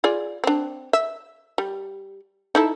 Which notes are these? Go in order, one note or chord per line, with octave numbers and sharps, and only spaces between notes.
F4 G#4 D5
C4 D4
E5
G3
D#4 E4 A4